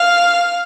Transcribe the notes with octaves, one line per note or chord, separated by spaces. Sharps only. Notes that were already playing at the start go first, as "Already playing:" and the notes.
Already playing: F5